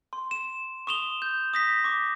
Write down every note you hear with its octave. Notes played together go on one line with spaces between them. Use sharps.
C6
E7
C#6 D#6 E7 F7 G7
G6
D#6 A#6 B6
C#6 D6